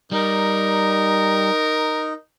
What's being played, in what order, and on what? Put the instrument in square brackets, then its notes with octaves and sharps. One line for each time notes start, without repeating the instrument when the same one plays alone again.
[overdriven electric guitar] G3 [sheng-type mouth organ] D#4 [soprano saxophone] A#4